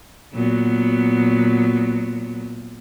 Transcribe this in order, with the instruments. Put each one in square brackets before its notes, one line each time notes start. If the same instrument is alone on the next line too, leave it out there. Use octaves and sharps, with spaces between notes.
[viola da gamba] A#2 F#3 B3